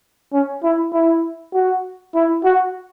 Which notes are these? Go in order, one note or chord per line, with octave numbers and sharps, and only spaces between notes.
C#4
E4
E4
F#4
E4
F#4